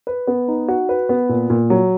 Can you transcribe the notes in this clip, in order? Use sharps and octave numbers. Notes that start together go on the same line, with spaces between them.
B4
B3
D#4
F#4
B4
B3
A#2
A#2
F#3